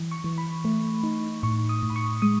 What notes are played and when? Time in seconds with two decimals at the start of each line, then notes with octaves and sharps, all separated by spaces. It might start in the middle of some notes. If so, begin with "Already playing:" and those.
Already playing: E3
0.11 C#6
0.24 E3
0.38 B5
0.65 A3
1.03 D#4
1.43 A2 C#6
1.69 D#6
1.82 A2
1.90 B5
1.96 C#6
2.22 G#3 D#6